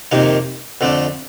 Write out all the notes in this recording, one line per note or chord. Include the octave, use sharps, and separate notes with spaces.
F2 C3 D#3 A#3 D#4
F2 D3 A3 D4